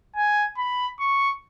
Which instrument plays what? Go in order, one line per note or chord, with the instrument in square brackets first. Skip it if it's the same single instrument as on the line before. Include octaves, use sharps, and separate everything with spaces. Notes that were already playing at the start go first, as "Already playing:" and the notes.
[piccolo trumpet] G#5
B5
C#6